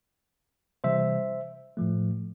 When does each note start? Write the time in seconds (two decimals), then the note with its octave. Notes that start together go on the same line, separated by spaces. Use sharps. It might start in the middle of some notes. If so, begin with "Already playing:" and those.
0.84 C3 E3 G3 C5 E5
1.77 A2 F3 A3